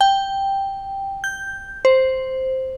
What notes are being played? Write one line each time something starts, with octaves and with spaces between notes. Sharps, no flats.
G5
G6
C5